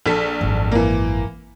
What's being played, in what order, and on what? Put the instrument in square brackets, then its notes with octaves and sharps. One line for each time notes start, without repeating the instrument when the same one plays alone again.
[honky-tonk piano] A#1 A4 B6
[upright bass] G#1 F#2
[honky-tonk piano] E3 A#3